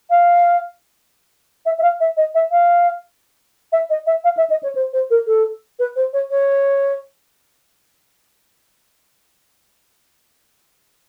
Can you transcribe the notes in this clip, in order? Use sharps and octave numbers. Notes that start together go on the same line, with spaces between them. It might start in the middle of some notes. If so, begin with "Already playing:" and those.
F5
E5
E5
F5
E5
D#5
E5
F5
E5
D#5
E5
F5
E5
D#5
C#5
C5
C5
A#4
A4
B4
C5
C#5
C#5